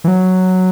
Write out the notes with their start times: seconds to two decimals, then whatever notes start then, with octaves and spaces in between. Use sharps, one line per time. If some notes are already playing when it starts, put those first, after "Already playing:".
0.04 E3
0.08 F#3